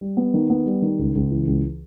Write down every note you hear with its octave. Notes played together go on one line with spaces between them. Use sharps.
G3
B3
D#3
B3
G3
D#3
C#2
C#2
E3
C#2